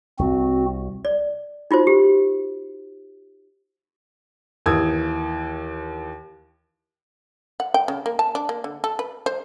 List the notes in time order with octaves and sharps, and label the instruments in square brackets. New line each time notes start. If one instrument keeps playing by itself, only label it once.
[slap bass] C2 [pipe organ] C4 F#4
[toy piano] D5
D#4 F4 F#4 C5
G4
[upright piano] D#2 E3 D#6 E6 G#6
[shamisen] F#5
G5
C#3
A#3
A5
D4
A#3
D3
A4
B4
C5